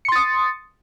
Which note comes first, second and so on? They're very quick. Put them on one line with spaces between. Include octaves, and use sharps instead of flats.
C#7 C6 A6 D#6